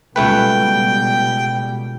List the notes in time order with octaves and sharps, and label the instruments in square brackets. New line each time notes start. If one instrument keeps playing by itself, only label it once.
[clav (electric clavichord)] C#2 A3 B4 [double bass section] B2 G3 [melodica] G5